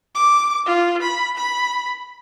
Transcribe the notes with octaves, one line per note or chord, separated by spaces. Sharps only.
D6
F4
B5
B5